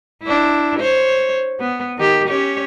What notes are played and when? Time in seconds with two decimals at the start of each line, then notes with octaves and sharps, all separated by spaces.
0.23 D4 E4
0.79 C5 C#5
1.60 B3
1.97 D#3 G4
2.27 C#4 G4 C#5